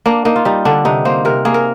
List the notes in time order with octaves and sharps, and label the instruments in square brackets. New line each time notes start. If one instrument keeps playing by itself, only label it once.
[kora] A#3 D4
A#3 D#4
F4
G3 D#4
D3 D4
C3 D#4
A#3 C5
C3 A#4
A#3 G#4
A#4